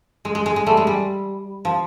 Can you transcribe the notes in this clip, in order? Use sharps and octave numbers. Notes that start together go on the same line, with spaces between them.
G#3
G#3
G#3
G#3
G3 A3
G#3
G3
F3